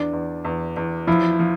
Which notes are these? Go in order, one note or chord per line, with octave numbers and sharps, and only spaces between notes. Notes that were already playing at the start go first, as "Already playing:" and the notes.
Already playing: E2 D4
E2
E2
E2
F3 E4
F3